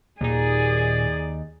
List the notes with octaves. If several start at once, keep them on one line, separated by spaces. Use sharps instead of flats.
D#2 A#2 D#4 G#4 D5